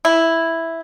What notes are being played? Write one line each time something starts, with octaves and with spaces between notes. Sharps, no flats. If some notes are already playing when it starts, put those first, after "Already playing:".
E4